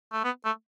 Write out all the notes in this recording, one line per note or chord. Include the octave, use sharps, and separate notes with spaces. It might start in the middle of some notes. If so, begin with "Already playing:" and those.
A3
B3
A3